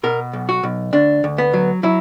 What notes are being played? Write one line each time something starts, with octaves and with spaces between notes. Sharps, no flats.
B2 A#4
B1
F#4
B1
D2 D4
D2
B3
F#3
F#3 E4